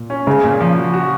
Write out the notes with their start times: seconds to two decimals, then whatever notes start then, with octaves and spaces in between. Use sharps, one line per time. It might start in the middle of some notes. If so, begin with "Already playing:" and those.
Already playing: A#2
0.10 C#4
0.26 C#3 G#3
0.44 A#2
0.60 F3
0.77 F#4
0.94 F#4